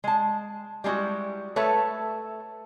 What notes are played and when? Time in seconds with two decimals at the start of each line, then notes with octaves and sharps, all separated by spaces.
0.04 G#3 A5
0.84 G3 G#3 D#4 E4 F#4
1.56 A3 A4 B4 C#5 E5